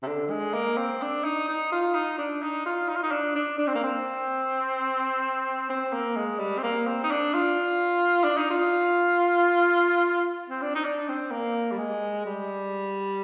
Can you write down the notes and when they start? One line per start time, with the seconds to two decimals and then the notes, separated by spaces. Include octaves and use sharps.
0.03 C3
0.07 D3
0.30 G#3
0.54 A#3
0.77 C4
1.02 D4
1.24 D#4
1.48 D#4
1.72 F4
1.94 D#4
2.18 D4
2.42 D#4
2.66 F4
2.88 D#4
2.96 F4
3.03 D#4
3.11 D4
3.35 D4
3.58 D4
3.67 C4
3.75 A#3
3.84 C4
5.70 C4
5.93 A#3
6.16 G#3
6.39 G3
6.58 C4
6.63 A#3
6.87 C4
7.04 D#4
7.11 D4
7.34 F4
8.24 D4
8.37 D#4
8.50 F4
10.50 C4
10.62 D4
10.75 D#4
10.84 D4
11.09 C4
11.32 A#3
11.71 G3
11.78 G#3
12.25 G3